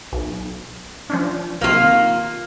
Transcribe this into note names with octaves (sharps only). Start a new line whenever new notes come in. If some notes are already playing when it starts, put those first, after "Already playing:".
B1
F3 C#4 D4
B1 C3 D#3 A#3 F4